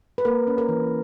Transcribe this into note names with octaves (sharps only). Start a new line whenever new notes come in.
B4
A#3 A#4
C#4
A#4
E3